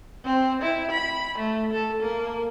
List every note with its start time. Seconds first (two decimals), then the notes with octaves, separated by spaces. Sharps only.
0.25 C4
0.61 E4
0.91 B5
1.38 A3
1.73 A4
2.02 A#3